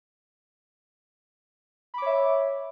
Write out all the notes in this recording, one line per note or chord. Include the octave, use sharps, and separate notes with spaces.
C#5 E5 B5 D6